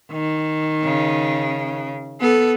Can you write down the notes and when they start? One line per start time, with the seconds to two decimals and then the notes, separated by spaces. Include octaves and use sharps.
0.12 D#3
0.84 C#3
2.21 B3 A4